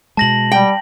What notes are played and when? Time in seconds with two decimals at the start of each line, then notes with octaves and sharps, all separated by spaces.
0.17 B2 G#3 A5 A#6 F#7
0.52 G3 G5